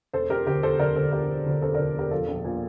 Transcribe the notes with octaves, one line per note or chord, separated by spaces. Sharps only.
E1 A4 C5
E1 G4 A#4
D2 G4 A#4
E1 A4 C5
D2 A#4 D5
D3 A4 C5
E1 G4 A#4
E1
D2
E1 A4 C5
A#4 D5
D2
E1 G4 A#4
F3 F4 A4
A#1
A#2